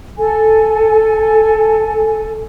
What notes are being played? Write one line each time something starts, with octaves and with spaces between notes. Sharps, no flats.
A4 G#5